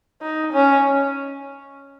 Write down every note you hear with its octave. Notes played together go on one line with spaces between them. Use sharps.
D#4
C#4